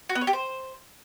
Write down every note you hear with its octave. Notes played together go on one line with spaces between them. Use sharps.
F#4
B3
C#5
G4
C5